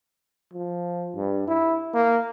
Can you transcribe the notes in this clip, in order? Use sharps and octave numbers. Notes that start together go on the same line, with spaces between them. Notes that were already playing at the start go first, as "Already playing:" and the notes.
F3
G2
E4
A#3